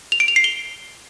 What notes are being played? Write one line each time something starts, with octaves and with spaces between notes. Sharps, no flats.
F7
D7
F7
C7
G7